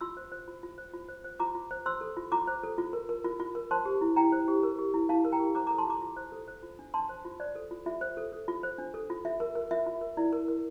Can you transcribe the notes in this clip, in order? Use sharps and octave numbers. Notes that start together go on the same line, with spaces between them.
F4 C6 E6
C5
C5
F4
F4
C5
F4
C5
C5
F4 A#5 D6
F4
C5
C5 C6 E6
A4
F4
F4 A#5 D6
C5
A4
F4
A#4
A#4
F4
F4
A#4
C5 A5 C6
G4
E4
E4 G5 A#5
C5
G4
A#4
G4
E4
E4 F5 A5
A#4
G5 A#5
G4
C5 A#5 D6
A4 A#5 D6
A5 C6
F4 A#5 D6
F4
C5
A4
C5
F4
D4
D4 A5 C6
C5
F4
C5 D5
A4
F4
F4 E5
C5
A4
A4
F4
C5
D4
A4
F4
F4 E5
A#4
A#4
F4 E5
F4
A#4
E4 D5
A#4
A#4